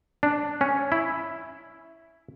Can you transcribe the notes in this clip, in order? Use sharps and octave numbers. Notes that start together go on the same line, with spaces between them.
D4
C#4
E4